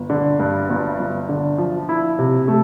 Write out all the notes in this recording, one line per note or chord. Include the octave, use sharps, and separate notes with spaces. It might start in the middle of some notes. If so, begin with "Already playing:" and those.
Already playing: G1
D3
G2
G1
G1
D3
F3
E4
C3
A3